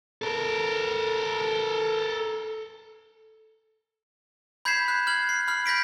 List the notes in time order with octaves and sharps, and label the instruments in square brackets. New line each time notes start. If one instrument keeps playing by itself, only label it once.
[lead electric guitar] A4 A#4
[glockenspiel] B5 G6 G#6 B6 C7 E7
F#6
F6 G#6 F#7
C7
B5 F6
B5 G6 A#6 B6 D7